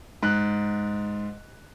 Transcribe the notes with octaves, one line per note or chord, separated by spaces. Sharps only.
G#2 F#6